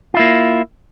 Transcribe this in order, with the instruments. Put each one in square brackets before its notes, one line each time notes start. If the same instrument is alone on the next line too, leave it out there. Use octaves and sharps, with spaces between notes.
[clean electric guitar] F4
E4
A#3